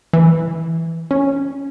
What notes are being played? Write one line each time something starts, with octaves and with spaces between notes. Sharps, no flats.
E3
C#4